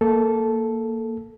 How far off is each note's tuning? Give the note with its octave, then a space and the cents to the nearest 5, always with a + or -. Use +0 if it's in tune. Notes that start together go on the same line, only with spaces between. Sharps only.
A#3 -10 A4 -10